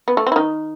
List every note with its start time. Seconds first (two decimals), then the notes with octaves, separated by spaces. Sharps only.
0.08 B3
0.17 A3
0.27 C4
0.32 E4
0.36 D#3 D#4